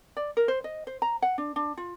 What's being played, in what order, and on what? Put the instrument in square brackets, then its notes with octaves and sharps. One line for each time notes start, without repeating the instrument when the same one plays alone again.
[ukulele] D5
A#4
C5
D#5
C5
A#5
F#5
D4
D4
F4